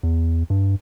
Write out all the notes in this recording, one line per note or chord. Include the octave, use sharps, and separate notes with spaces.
E2
G2